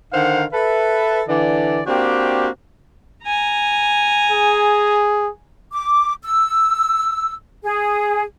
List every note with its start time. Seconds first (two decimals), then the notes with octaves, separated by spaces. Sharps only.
0.13 D3 D#3 D#4 C5 F5 F#5
0.52 A4 B4 E5
1.28 D3 E3 D5
1.86 A#3 C4 D4 F#4 G4
3.24 G#5 A#5
4.31 G#4
5.72 D6
6.23 E6
7.64 G#4